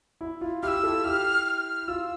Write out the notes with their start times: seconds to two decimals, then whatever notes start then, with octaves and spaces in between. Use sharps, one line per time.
0.21 E4
0.41 F4
0.63 E4 G4 F6
0.68 E6
0.75 G4
0.83 F4 A4
1.04 E4 G4 F6
1.46 F6
1.88 F4 E6